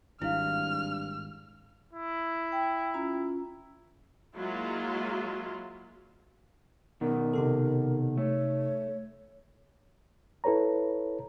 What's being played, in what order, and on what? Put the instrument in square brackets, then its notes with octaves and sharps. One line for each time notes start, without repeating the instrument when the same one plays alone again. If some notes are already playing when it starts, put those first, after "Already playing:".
[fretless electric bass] G#1 [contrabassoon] G2 [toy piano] E4 F5 [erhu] F6
[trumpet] E4
[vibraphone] G5
C#4 F4 A#5
[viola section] F#3 G#3 A#3 E4 F4
[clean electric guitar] B2 D#3 [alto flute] A#4
[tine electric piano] C3 D#4 A4
[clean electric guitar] A3 [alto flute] C#5
[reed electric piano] E4 A4 B4 C#5 A#5